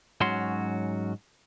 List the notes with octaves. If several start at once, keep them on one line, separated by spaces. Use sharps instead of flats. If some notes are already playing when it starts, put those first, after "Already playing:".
G#2 F#3 C#4 F#4 C6